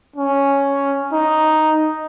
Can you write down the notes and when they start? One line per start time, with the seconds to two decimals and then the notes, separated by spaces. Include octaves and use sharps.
0.16 C#4
1.13 D#4